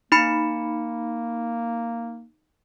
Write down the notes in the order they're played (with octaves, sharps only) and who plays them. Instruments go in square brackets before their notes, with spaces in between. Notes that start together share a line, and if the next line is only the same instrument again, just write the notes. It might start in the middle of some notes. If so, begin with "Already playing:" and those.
[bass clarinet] A#3 [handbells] D#4 B5 C#7